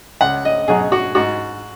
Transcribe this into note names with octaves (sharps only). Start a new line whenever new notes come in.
C#2 F#5
D#5
B2 F#3 G#4
F#4
G#2 F#4